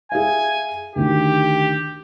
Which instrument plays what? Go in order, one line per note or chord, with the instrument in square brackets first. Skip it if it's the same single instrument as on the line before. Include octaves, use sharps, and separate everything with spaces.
[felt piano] G#4 E5 F5 [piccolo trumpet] G#5
[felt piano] D2 D#3 [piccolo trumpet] G4